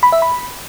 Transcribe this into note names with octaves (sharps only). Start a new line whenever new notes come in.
B5
E5
B5